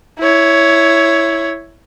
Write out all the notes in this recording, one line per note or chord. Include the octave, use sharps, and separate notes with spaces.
E4 C#5